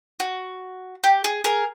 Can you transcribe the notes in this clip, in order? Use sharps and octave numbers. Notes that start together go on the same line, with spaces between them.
F#4
G4
G#4
G#4 A#4